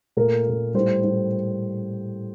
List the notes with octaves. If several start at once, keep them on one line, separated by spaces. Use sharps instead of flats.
A#2 A3 A#4
A#2 A3
A2 G3 C5
A2 G3